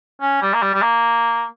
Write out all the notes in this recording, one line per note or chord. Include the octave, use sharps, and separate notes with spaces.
C#4
G3
A#3
G3
G3
A#3